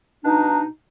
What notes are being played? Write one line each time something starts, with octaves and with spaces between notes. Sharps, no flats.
B2 D4 D#4